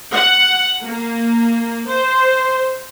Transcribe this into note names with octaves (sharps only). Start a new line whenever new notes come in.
F#5
A#3
C5